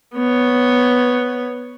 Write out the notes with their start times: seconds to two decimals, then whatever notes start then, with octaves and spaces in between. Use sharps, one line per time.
0.16 B3 C#5